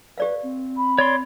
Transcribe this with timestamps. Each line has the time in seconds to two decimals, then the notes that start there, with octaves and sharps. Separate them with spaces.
0.18 G4 B4 D5 F5
0.43 C4
0.77 B5
0.98 C#5 D5 C6